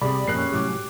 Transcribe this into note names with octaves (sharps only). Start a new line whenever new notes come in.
C2 C3 G4 G#4 D5 B5
F2 A#2 A#3 C#4 F#6 C7
C2 A2 F#3 G4 D6